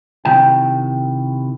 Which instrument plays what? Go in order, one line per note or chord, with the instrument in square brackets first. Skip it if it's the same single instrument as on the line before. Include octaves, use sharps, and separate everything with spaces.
[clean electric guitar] C3 D#3 E4 G5